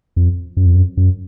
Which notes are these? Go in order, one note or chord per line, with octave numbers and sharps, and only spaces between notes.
F2
F#2
F2
F#2
F#2